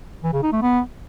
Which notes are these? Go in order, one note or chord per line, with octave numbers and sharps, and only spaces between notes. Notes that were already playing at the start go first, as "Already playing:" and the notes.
E3
C#3
D#4
A3
B3